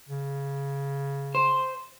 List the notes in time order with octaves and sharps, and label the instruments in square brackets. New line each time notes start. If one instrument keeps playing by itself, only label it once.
[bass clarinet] C#3
[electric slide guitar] C5